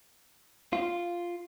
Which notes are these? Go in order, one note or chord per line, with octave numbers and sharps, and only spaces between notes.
F4